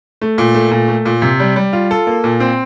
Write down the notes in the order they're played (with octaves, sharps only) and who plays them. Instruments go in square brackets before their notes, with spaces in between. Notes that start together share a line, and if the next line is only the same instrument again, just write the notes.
[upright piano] A3
A#2
A3
A#2
A3
A#2
C3
G3
G3
F4
A4
A#3
A#2
C4